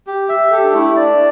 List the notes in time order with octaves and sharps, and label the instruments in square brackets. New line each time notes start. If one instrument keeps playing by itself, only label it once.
[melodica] G4
E5
[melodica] G4 [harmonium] A4
[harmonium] D4
[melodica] A3 [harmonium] E4
[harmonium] D4 [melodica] D5